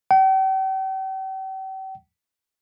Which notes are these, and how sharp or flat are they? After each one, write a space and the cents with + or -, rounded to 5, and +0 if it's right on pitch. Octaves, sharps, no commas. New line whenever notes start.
G5 -45